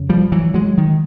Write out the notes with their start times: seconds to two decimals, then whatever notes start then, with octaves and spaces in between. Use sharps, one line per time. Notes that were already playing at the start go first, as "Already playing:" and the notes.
Already playing: F2 C#3
0.09 F3 G3
0.32 E3 F#3
0.54 F#3 G#3
0.78 D#3